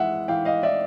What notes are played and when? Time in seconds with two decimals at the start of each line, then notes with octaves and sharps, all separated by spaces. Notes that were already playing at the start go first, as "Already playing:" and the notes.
Already playing: E3 G#3 E5 F#5
0.28 E3 F5 G5
0.45 D#5 F5
0.63 E3 D5 E5